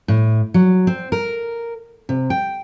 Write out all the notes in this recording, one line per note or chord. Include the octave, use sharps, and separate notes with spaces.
A2
F#3
C4
A#4
C3
G5